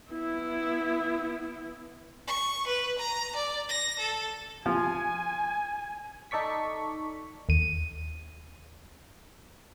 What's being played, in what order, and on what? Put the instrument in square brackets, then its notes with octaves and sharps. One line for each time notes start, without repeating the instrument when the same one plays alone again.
[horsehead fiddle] B3 E4
[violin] C#6
B4
A#5
D5
A#6
A4
[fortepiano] F3 [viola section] G#5
[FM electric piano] D#4 A4 D5 C#6 B6
[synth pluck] D#2 D#7